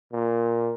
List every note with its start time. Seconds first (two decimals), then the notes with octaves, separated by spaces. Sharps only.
0.13 A#2